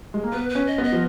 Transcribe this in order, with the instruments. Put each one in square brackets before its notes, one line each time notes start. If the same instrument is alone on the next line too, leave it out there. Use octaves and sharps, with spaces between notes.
[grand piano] G#3
A#3
[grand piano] B3 [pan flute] B4
[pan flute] B4
[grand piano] C#4
[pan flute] D#5
[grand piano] B3
[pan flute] D#5
[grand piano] F3